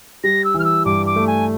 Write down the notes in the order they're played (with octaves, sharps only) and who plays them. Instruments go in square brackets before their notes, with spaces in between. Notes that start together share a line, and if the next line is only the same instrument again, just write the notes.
[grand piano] G3 [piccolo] A#6
[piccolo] E6
[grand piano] E3 [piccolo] F6
[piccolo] E6
[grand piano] G2 [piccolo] D6
[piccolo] D6
[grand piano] A3
[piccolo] G#5